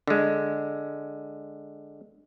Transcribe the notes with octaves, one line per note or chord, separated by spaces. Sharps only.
D3 G#3